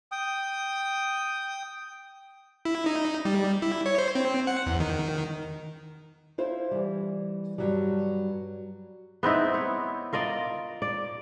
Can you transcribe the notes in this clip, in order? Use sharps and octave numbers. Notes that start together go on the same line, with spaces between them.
G5 D#6
E4
D#4
G3
E4
C#5
C5
C4
F#5
E2
D#3
E4 F4 C5 F5
E3 G3
G2 F#3 G3
B3 C4 D#4 E4
E4 C#5
F4 A#4 D5 D#5
D5